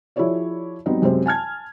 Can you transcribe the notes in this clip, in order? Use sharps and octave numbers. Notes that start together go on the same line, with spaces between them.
F3 E4 F#4 G#4 C#5 D5
F#3 G3 B3 C4 D#4
F#2 C3 G#3 C5
G#5 A5 F6 G#6